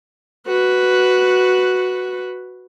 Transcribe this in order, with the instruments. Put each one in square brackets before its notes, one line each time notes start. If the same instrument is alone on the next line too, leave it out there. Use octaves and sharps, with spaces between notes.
[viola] F#4 B4